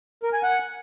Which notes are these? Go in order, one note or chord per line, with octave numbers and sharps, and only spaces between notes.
A#4
G#5
F#5